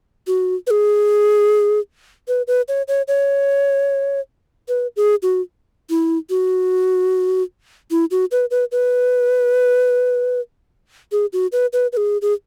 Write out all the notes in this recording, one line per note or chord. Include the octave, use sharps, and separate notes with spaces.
F#4
B4
G#4
B4
B4
C#5
C#5
C#5
B4
G#4
F#4
E4
F#4
E4
F#4
B4
B4
B4
G#4
F#4
B4
B4
B4
G#4
G#4